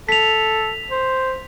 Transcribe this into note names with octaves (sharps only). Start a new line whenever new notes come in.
A4 B6 F7
C5